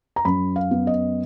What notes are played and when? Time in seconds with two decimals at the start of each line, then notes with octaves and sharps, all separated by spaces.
0.16 A#5
0.25 F#2 B5
0.56 F5
0.71 B3
0.87 D#5